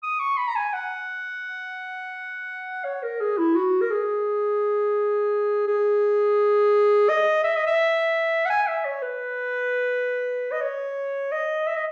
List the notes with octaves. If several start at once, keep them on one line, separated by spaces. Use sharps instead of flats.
D#6
C#6
B5
A#5
G#5
F#5
C#5
A#4
G#4
E4
F#4
A#4
G#4
G#4
D#5
E5
D#5
E5
F#5
G#5
E5
C#5
B4
D#5
C#5
D#5
E5
D#5